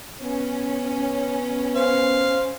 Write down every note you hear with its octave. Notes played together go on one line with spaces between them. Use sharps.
B3 C#4
C5 F5